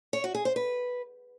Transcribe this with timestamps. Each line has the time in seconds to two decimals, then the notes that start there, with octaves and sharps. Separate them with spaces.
0.13 C#5
0.24 F#4
0.35 G#4
0.45 C5
0.56 B4